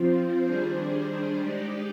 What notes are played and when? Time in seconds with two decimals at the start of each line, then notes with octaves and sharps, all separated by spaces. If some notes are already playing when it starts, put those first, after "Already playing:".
Already playing: F3 C4 F4 C5
0.43 D#3 G3 D4 G#4 C5
1.40 G#3 D#4 G4 D5